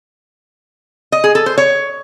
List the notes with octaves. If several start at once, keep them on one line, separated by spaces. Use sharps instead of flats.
D#5
G#4
A4
C5
C#5